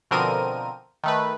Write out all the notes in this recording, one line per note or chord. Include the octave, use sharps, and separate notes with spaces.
B2 D3 F3 C4 A#4 D#7
D#3 A3 B4